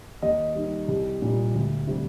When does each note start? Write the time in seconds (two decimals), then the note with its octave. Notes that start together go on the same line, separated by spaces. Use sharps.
0.22 D#2 D#5
0.55 D#3 G3
0.88 C2
1.22 A#2 G3
1.54 D2
1.87 C3 G3